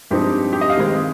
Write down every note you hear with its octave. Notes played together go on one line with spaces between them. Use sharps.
G2 F3 G#3 C4 D#4 G4
G4
D#5
F5
D#3 G#3 C4